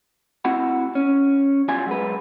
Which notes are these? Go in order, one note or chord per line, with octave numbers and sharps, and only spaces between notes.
C4 E4 F#4 F#5 B5
C#4
E2 F#3 G3 F4 G#5
F#3 G#3 B4